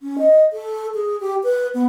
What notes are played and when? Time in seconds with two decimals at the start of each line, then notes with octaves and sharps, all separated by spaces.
0.01 C#4
0.18 D#5
0.53 A4
0.95 G#4
1.20 G4
1.43 B4
1.74 B3